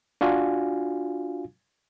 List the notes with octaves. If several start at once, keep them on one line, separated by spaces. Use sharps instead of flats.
D4 F4 F#4 F5 G#5